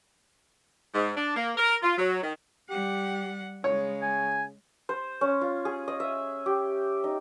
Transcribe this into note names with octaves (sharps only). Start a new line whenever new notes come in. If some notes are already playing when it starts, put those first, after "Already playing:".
G#2
D4
A#3
A#4
F4
F#3
D#3
G3 G4 F#5
C#3 G#3 C#5
G#5
C5
C#4
F4
G#4
D#5
E5
G4
D#4